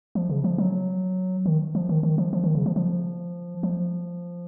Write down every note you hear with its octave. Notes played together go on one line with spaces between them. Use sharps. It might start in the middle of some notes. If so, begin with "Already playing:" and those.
F3
C#3
F3
F#3
D#3
F3
D#3
D#3
F3
F3
D#3
C#3
F3
F3
F3